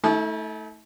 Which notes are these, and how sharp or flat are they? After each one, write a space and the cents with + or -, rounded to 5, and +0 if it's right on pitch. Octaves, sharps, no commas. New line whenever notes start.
A3 +0 E4 -45 A5 -45